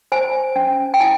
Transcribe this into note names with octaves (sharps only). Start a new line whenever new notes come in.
C5 G#5
C#4
G5
E4 G#5